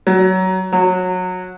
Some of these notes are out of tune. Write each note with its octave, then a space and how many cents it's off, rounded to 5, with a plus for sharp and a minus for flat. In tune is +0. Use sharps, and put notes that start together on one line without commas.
F#3 +15
F#3 -25